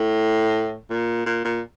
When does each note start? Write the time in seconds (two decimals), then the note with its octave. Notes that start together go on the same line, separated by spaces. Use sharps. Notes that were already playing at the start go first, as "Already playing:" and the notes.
Already playing: A2
0.90 A#2
1.26 A#2
1.44 A#2